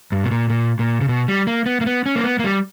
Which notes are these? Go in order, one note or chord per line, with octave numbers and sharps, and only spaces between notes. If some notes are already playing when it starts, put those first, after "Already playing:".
G2
B2
A#2
A#2
A#2
C#3
B2
G3
A#3
B3
A#3
B3
C#4
A#3
B3
A#3
G3